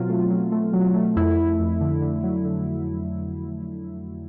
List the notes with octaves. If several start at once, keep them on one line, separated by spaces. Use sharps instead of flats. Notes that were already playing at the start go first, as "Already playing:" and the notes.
Already playing: B2 F#3 C4 F4
A3
F#3
A3
F#3
A3
F2 E4
F2
F2
D3
D3
F#3
D3